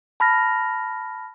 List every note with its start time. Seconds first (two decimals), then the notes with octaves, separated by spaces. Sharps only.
0.20 A5 B5 F6 A#6